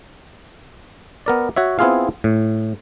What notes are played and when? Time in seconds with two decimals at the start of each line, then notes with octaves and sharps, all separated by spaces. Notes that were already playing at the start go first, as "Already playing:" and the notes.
1.26 B3 A#4 D5
1.56 F#4 C#5 E5
1.79 B3 C4 E4 F4 G#4 F5
2.24 A2